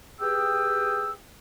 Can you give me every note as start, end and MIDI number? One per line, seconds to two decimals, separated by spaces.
0.21 1.13 67
0.21 1.13 68
0.21 1.13 71
0.21 1.13 79
0.21 1.13 87
0.21 1.13 88